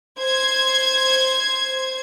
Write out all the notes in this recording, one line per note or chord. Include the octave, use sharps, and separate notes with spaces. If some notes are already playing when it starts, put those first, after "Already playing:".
C5 G#6